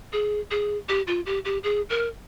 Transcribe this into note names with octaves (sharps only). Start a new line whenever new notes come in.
G#4
G#4
G4
F4
G4
G4
G#4
A#4